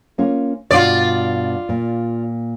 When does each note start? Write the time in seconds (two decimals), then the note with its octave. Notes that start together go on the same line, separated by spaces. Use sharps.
0.18 A#3 C#4 F4
0.71 G2 B2 F4 D5
1.69 A#2